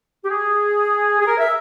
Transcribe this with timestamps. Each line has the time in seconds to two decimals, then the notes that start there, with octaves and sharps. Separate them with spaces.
0.25 G4
0.30 G#4
1.21 G#4
1.27 A#4
1.38 E5